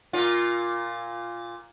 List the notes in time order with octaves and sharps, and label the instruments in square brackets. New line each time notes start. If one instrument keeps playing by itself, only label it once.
[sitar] A#2 F4